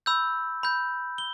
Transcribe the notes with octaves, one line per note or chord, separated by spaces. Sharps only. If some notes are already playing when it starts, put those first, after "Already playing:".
B5 E6 G6
B5 G6
G7